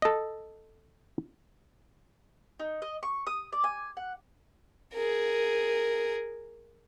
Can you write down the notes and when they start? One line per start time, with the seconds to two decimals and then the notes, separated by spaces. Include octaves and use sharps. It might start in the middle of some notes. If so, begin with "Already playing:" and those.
0.02 A4 D#5
2.60 D#4
2.82 D#5
3.03 C#6
3.27 D#6
3.52 D5
3.64 G#5
3.97 F#5
4.94 G#4 A#4